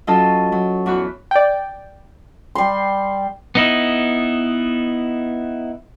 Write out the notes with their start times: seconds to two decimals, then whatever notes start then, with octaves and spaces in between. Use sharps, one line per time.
0.07 F#3 C#4 F4 A4 D#5 A5
0.52 F#3
0.86 E2 F#4 B5
1.31 D5 G5
2.55 G3 C6
3.55 B3 D#4 E4